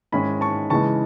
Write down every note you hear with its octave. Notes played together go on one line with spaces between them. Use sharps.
G#2 D#3 G#3 C#4 E4 G#5 B5
A5 C#6
C#3 E3 G#3 A5 C#6